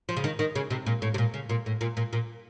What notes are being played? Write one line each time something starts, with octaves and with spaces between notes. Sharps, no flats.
F3
C#3
D#3
D#3
C#3
C3
A#2
A2
C3
A#2
C#3
A#2
A2
A#2
A#2
A#2